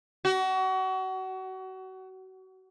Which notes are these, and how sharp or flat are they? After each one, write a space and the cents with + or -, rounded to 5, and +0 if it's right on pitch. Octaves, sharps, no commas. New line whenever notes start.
F#4 +30